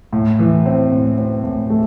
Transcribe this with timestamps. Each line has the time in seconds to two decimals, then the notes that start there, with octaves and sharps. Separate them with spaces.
0.13 A2
0.39 E3
0.66 C4
0.92 A2
1.18 C4
1.44 A2
1.70 A3